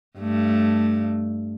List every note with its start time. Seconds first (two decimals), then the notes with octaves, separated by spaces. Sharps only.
0.19 G2 A3